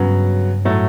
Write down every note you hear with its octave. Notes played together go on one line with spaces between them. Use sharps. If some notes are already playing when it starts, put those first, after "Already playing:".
Already playing: G2 C#3 F#3 B3
A2 F#3 A3